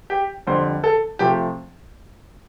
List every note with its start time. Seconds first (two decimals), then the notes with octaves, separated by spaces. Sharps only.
0.10 G4
0.47 F2 D3 G3 C5
0.84 A4
1.19 C3 F3 A3 G4